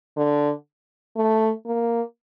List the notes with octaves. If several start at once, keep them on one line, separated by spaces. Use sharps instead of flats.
D3
A3
A#3